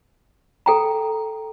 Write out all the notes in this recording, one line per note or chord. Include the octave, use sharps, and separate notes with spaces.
A4 G5 A#5